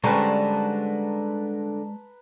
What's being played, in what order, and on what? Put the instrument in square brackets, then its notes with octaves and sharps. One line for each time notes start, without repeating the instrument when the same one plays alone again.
[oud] D3 G3 C#4 [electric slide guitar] G#3 C5 [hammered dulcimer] B4 A5 A#5